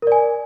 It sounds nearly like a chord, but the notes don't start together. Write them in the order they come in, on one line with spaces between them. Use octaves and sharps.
A#4 D5 G#5